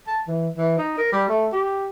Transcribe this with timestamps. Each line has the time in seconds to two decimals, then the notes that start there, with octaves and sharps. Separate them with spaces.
0.07 A5
0.27 E3
0.58 E3
0.78 D#4
0.98 A#4
1.12 G3
1.29 A3
1.53 G4